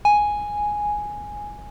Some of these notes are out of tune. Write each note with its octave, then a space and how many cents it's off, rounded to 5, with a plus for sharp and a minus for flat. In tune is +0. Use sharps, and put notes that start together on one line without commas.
G#5 +0